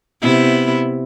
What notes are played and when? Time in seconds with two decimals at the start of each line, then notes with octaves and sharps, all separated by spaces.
0.22 C3 B3 E4